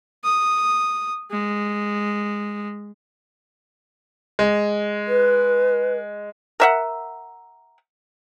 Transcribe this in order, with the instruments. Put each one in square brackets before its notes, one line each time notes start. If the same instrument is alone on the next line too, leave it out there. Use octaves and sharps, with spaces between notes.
[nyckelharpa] D#6
G#3
[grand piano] G#3
[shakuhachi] B4
[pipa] A#4 E5 F#5